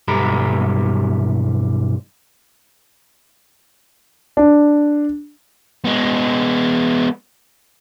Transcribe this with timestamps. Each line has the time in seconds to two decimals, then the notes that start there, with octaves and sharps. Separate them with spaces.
0.08 B1 G2 G4 A4 A#5 B5
4.37 D4
5.85 G#3 B3